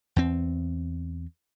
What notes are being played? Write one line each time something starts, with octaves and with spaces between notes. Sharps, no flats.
E2 C4